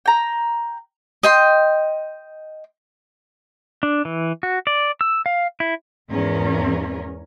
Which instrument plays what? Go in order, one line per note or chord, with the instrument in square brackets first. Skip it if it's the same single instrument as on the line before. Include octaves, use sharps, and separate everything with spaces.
[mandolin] G5 A#5
[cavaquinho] D#5 G5 C6
[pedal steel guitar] D4
E3
F#4
D5
E6
F5
E4
[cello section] E2 G#2 C#4 A#4